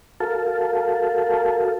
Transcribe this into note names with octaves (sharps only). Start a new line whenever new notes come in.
F#4 A4 A#4 F5 A5